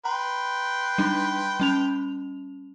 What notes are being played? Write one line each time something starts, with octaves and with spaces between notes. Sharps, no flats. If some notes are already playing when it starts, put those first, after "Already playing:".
B4 G5 A#5 C6
G3 D4 D#4
G3 C#4 F7